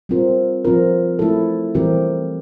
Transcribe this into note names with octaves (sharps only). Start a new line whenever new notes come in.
G3 C4 F4 A#4
F3 C4 F4 A#4
A3 E4 A4
E3 G3 C4 G4 A#4